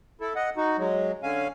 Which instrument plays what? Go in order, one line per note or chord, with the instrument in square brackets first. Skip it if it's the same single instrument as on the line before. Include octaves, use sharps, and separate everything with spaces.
[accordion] E4 A4
D#5 F#5
D#4 F#4
F#3 G#3
D3 C#4 F5 G#5